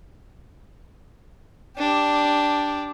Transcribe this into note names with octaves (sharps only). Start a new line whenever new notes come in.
D4 G4